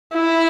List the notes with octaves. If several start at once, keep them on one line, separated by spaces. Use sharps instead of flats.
E4